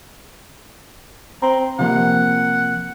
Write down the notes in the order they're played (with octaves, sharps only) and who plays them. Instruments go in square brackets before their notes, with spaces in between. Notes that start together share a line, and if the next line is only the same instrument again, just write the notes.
[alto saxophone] C4 [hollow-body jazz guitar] A#5
[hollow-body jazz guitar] C3 F3 A#3 [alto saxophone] F#5